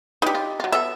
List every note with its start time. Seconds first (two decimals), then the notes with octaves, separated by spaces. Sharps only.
0.22 D4 D#4 G4 B4
0.35 F4
0.60 F#3 F4
0.72 B3 A4 E5